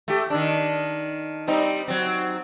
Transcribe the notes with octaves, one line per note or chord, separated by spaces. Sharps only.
A3 G4
D#3 D4
G3 C4 D#4
F#3 C4